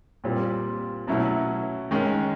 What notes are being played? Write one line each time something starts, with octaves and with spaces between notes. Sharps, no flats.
A#2 G3 C4 F4
B2 F#3 A3 C#4 E4
D#3 G#3 C#4